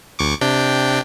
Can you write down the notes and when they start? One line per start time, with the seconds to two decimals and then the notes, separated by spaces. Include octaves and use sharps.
0.19 D2 C#6 D6
0.41 C3 D4 G5